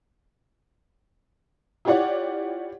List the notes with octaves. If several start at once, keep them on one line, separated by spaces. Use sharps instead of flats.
E4 F4 G4 C#5 D5 F#5